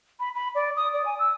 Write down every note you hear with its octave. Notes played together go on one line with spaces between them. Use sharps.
B5
B5
D5
D#6
D5
G#5
E6